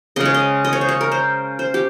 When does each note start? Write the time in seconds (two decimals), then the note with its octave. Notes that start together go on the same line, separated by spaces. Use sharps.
0.16 C#3 G#3 D#5
0.26 C#5
0.34 D#5
0.65 D#5
0.73 C#5
0.81 C5
0.89 C#5
1.01 A#4
1.11 C5
1.59 C5
1.74 G4